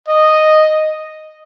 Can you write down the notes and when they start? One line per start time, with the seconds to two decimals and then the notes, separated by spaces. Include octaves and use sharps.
0.08 D#5